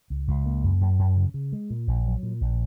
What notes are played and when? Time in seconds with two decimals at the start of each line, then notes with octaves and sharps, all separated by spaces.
0.10 C#2
0.28 C#2
0.46 A#3
0.64 F#2
0.81 F#2
0.99 F#2
1.17 C#3
1.34 C#3
1.53 G#3
1.70 A#2
1.87 A#1
2.05 F#3
2.23 A#2
2.41 A#1